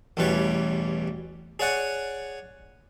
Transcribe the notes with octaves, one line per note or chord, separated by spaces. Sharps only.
A1 E2 B2 G3 B4 C#5
G#4 C#5 D5 F#5 G#5